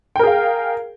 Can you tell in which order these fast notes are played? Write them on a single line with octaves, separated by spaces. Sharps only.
G5 A#4 G#4 F5